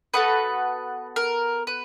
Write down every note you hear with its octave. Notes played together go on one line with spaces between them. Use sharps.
B3 D#4 F#4 A4 B4
A#4
B4